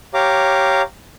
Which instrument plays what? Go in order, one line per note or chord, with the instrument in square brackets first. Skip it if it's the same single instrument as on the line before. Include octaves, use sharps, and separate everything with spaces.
[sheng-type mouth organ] G4 C#5 F5 A#5 D6